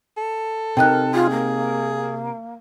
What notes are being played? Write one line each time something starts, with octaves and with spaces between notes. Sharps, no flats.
A4
C3 D#4 A#4 G5 F#6
F4 G#4
A#3